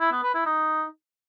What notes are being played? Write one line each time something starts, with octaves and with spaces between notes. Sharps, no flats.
E4
B3
B4
E4
D#4